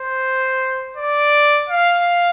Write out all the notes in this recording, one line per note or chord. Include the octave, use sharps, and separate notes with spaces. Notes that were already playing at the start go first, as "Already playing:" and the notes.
Already playing: C5
D5
F5